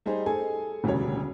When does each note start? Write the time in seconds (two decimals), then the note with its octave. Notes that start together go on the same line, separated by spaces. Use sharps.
0.06 G3 D#4 G#4 C5
0.26 G#4 A4 G#5
0.84 E1 D2 C#3 G3 C#5